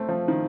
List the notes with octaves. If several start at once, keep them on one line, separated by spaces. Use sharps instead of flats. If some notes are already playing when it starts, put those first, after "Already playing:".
Already playing: A3 C4
F3
D#3